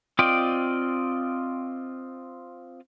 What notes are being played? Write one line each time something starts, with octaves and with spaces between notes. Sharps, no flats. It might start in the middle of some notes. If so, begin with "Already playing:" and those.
C4 F4 D5 D#5 G5